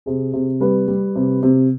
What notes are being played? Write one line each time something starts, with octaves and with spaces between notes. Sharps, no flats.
C3 G#4
C3
G3 B4
G3
C3
C3